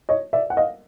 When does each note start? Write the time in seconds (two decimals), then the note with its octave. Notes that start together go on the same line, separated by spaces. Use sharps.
0.09 C#5 D#5
0.33 D5 E5
0.50 F#5
0.57 D#5 F5